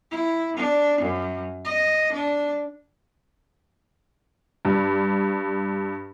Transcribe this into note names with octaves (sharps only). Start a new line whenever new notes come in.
E4
D4
F#2
D#5
D4
G2